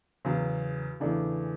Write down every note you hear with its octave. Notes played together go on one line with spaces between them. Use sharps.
E2 C#3 F#3
E2 C#3 E3 A3 D4